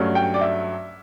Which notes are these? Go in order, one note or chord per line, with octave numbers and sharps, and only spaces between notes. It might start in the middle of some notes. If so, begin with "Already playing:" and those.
Already playing: G2 F#3 A3 C#4
G5
D5
E5